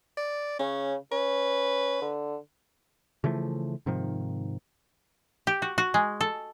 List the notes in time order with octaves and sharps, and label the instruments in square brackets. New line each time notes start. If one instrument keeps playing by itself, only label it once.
[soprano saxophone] D5
[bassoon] C#3 [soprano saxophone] C#4
[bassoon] C#4 [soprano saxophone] B4
[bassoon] D3
[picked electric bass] C#3 E3 F3 A3
G#2 C3 D#3 F3
[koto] G4
F#4
F#4
G#3
A4